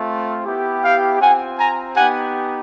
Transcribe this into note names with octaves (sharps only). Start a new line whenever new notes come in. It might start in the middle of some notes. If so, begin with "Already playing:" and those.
Already playing: A3 C4 F4
B3 E4 G4
F5 G5
C4 F4 F#5 G#5
G#5 A#5
B3 D#4 G4 F#5 G#5